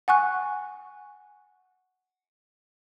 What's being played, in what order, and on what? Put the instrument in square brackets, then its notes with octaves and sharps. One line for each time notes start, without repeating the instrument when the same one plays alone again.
[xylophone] F#5 G#5 C#6 F#6